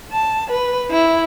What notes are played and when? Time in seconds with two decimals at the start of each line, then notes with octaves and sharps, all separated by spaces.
0.12 A5
0.51 B4
0.91 E4